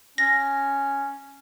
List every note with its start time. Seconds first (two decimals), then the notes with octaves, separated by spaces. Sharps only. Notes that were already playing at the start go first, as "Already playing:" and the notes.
0.18 C#4 A#6